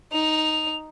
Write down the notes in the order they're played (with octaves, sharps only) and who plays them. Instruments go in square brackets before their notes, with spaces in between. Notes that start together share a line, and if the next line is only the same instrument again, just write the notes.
[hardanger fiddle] D#4 [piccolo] F7